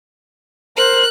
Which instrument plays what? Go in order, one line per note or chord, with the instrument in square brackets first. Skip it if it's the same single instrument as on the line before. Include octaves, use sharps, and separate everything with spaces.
[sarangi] A#4 [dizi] C5 [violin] F#6